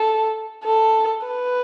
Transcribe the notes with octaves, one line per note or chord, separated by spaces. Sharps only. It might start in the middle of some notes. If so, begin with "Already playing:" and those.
Already playing: A4
A4
B4